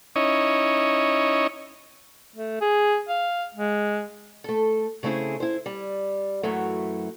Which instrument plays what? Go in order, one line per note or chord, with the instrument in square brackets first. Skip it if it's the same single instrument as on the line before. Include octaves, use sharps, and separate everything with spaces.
[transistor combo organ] C#4 D#4 E4 C#5 D#5
[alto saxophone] A3
G#4
F5
G#3
[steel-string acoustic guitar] A3 A4
C#3 A3 C4 E4 G#4
E4 C5
G3
F#2 E3 F#3 A3